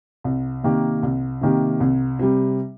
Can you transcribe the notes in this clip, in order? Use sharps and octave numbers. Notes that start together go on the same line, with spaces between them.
C2
C3 D#3 A#3 G4
C2
C3 D#3 A#3 G4
C2
C3 G3